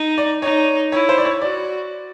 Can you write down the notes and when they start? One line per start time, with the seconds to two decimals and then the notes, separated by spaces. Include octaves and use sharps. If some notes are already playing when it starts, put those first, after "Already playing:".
Already playing: D#4
0.18 D5
0.42 D#4 C#5
0.92 E4 C#5
1.09 C5
1.18 D5
1.25 C#5
1.42 F#4 D5